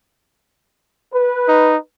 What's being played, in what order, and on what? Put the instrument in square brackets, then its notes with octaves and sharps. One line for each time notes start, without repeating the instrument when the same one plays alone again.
[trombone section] B4
[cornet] D#4